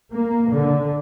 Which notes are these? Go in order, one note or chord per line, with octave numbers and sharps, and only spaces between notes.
A#3
D3